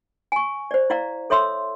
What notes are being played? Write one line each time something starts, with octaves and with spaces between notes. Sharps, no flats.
G#5 C#6
C5 D5
E4 D5 F5 A#5
A4 C#5 E5 C6 E6